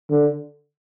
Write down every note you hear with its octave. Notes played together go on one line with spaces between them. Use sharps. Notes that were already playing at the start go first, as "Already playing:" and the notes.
D3